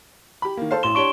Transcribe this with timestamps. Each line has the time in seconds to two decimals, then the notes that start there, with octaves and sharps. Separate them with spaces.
0.42 G4 B5
0.57 D#3 A#3
0.71 A4 C5 F5
0.83 A1 C6 E7 G7
0.95 D4 G4 C#5 C#6 D7 G7